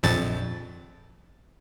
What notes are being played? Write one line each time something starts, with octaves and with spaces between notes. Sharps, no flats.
A#1 F2 A6